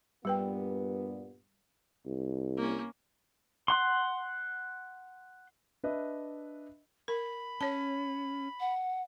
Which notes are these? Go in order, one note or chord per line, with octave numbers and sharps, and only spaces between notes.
G2 A#2 G3 B3 B4 G5
C2
A#3 C#4
F#5 C6
D4 B4 D#5 E5
A#4 B5
C#4 C#5 A5
F#5